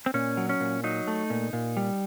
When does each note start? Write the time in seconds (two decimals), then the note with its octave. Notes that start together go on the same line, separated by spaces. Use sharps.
0.06 C4
0.14 A#2 C#4
0.37 F#3
0.49 C#4
0.60 A#2
0.84 F#3 D#4
1.07 A3
1.30 A#2
1.53 A#2
1.77 G3